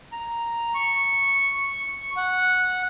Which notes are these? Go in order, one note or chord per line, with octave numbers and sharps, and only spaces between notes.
A#5
C#6
F#5